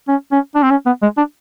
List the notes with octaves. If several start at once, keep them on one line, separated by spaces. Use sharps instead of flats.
C#4
C#4
D4
C4
C#4
B3
G#3
D4